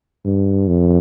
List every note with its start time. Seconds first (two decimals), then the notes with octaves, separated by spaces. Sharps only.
0.25 G2
0.68 F2